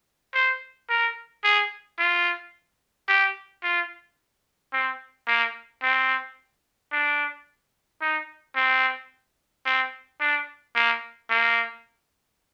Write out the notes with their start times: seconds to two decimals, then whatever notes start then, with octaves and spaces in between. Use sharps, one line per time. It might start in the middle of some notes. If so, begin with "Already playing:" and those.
0.35 C5
0.89 A#4
1.44 G#4
1.99 F4
3.09 G4
3.64 F4
4.73 C4
5.27 A#3
5.82 C4
6.92 D4
8.01 D#4
8.56 C4
9.66 C4
10.20 D4
10.75 A#3
11.30 A#3